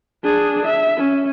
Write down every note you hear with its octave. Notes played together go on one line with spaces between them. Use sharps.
D4 G#4
E5
C#4